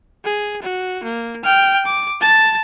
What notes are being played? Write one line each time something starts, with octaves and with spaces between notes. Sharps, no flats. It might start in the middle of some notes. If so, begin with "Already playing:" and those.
G#4
F#4
A#3
G5 F6
D6
A5 A6